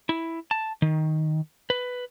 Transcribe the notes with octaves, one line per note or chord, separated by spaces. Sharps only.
E4
A5
D#3
B4